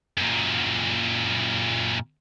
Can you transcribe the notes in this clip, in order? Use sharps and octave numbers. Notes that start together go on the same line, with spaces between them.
F#2 A#2